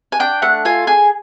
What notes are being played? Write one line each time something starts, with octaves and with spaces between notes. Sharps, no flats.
G#5
D4 G5
A3 F#5
F4 G#5
G#4 G#5